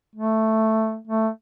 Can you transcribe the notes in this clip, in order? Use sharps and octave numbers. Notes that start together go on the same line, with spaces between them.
A3
A3